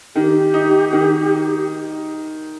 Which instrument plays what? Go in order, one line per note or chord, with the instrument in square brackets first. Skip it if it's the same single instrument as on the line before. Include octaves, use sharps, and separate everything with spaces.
[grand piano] D#3 [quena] G4
[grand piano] D#4
D#3